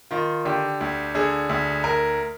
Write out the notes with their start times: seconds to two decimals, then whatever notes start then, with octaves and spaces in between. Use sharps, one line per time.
0.11 D#3 F4
0.45 D3 G4
0.81 D2
1.15 D3 G#4
1.49 D2
1.84 A#4